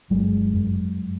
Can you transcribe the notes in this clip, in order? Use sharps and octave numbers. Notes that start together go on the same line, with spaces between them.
G1 F#3 G#3
F#2